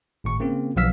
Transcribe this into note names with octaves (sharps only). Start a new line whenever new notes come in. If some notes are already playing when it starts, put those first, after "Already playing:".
G#1 A2 C#6
C#3 A#3 C4 F4
B1 F3 B3 F5 E6 B6